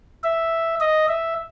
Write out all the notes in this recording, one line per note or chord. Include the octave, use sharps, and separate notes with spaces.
E5
D#5
E5